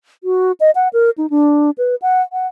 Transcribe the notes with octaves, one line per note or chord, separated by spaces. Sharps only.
F#4
D#5
F#5
A#4
D#4
D4
B4
F#5
F#5